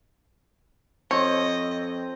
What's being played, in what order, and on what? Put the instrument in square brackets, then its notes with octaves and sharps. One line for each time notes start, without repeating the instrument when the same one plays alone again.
[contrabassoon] F2 [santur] C4 [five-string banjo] C#5 [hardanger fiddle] D#5